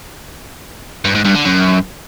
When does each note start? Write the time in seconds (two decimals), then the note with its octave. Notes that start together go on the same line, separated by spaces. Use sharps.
1.05 G2
1.15 G#2
1.25 G2
1.35 D3
1.45 F#2